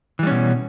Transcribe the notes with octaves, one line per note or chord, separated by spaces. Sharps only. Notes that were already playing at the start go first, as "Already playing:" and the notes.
B2 E3 G3 C#4